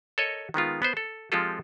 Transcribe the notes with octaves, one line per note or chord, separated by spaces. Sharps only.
A4 A#4 C#5 D#5
D#3 G#3 B3 F4
B3 B4 C5
A4
F3 G#3 C4 F4 G4 A4